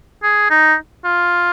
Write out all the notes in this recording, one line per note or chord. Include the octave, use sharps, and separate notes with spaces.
G#4
D#4
F4